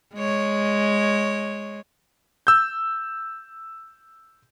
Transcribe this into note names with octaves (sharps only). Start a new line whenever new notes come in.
G#3 C#5
E6 G6